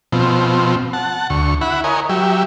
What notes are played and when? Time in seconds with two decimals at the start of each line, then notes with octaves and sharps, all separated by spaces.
0.12 B2 F3 C4
0.93 F#5 A5
1.30 D2 C#6
1.61 E4 F#5 B5
1.84 A#4 C#5 D#5 G#5
2.09 F#3 G4 E5